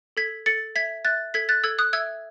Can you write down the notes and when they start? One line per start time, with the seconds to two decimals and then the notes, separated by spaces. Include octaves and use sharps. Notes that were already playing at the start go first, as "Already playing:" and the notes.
0.17 A4 G#6 B6
0.46 A4 A6 C#7
0.75 E5 G#6 B6
1.05 E5 F#6 A6
1.34 A4 G#6 B6
1.49 F#6 A6
1.64 A4 E6 G#6
1.79 D#6 F#6
1.93 E5 E6 G#6